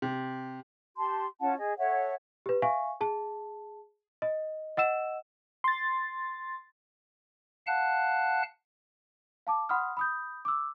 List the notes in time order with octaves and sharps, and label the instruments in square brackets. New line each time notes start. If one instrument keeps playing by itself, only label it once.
[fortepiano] C3
[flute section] G4 A5 C6
C#4 F4 F#5 A5
G#4 D#5
A4 C#5 E5 F#5
[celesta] G4 B4
E5 F5 G#5 C#6
G#4 A5
D#5
D#5 F#5 E6 E7
[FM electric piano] C6 A6
[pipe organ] F5 F#5 A5 F#6
[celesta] F5 A5 D6
F#5 B5 C6 D#6 F6
B5 D#6 G6
D6 E6